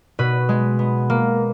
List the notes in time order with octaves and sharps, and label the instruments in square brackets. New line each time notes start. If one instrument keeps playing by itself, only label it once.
[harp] B2 B4
G#3
B3
A#3